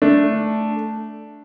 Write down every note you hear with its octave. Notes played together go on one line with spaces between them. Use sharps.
A3 D4